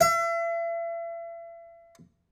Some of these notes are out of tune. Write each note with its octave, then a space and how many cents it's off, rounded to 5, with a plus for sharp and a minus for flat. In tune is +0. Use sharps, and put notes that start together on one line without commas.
E5 +35